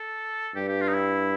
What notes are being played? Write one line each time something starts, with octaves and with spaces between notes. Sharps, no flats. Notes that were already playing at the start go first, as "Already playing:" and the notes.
Already playing: A4
G2 G4
G4
F4
D#4
E4